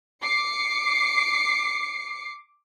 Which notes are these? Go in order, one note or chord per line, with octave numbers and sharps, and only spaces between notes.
D6 C7 C#7